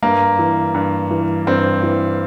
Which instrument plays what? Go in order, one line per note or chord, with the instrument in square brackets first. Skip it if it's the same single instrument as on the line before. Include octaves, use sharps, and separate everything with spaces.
[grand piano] G2 A#3
E3
G2
E3
G2 C4
E3